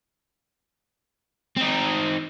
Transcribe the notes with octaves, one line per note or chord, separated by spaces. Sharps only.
C4 D#4